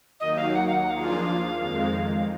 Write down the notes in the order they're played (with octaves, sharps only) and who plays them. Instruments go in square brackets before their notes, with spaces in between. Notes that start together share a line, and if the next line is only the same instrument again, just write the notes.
[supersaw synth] D#2 D#3 F#3 A#3 D#4 [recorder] D#5
[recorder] F5
F#5
F5
F#5
[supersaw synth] F3 A#3 D4 F4 G#4 [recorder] F5
[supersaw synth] F2 D#3 G#3